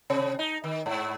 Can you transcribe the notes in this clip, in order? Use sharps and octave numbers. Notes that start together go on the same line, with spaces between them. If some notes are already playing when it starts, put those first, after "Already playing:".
C3
D#4
D#3
G#2